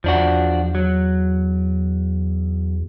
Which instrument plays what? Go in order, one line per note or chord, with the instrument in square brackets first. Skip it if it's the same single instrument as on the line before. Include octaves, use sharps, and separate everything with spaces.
[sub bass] E2 [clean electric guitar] F3 D4 F#4
[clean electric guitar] F#3